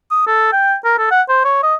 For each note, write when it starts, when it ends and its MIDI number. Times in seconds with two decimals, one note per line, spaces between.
0.11 0.25 87
0.27 0.50 69
0.52 0.75 79
0.85 0.93 70
0.98 1.10 69
1.11 1.22 78
1.29 1.44 72
1.45 1.60 73
1.63 1.75 75